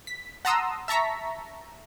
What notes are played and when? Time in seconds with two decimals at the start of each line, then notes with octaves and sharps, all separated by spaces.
0.07 B6
0.45 F#5 A5 A#5 C6 D#6 E6
0.88 E5 A5 A#5 C#6 B6